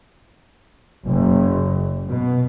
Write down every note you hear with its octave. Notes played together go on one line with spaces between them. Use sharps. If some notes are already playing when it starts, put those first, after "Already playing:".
F#1
B2